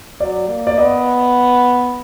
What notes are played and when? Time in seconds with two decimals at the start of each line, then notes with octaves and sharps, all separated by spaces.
0.20 F#3 D5
0.49 A#3
0.67 D5
0.78 B3 D#5